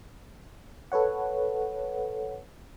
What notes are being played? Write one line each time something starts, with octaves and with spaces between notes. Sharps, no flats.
A4 B4 C#5 F#5